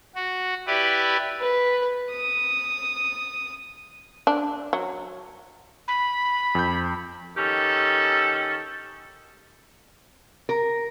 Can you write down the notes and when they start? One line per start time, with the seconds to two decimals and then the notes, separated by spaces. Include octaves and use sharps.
0.15 F#4
0.67 E4 G4 B4 D5
1.40 B4
2.11 D#6
4.27 D4
4.73 F#3
5.88 B5
6.55 F2 G6
7.36 D#3 C#4 G4 A4
10.49 A#4